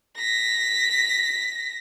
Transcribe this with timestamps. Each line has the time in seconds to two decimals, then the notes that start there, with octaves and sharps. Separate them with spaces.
0.17 A#6 B6